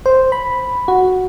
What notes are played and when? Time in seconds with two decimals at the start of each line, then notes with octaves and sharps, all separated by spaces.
0.06 C5
0.32 B5
0.88 F#4